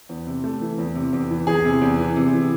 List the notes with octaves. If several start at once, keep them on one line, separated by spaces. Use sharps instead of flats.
E2
C3
A3
E3
E2
C3
E2
E3
E2 G#4
C3
E2
E3
C3
E3